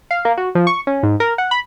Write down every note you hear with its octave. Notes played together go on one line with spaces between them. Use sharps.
F5
A#3
F#4
F3
C#6
C#4
G#2
A#4
F#5
B5